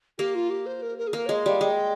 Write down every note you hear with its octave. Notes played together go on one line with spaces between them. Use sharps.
A#3 G4
F4
G4
C5
A#4
A#4
G#4
A#3 A#4
G#3 C#5
D#5
G3 F5
G#3 G5